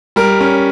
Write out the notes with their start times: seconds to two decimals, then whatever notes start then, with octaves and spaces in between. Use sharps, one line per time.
0.16 G3 A#4
0.41 C#4